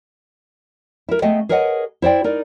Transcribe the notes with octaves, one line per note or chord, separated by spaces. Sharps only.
E4 A#4
A3 B3 G#4 D#5 G5
G#4 A#4 B4 C#5 D#5 F#5
E4 C5 D5 G5
D#4 A#4 D5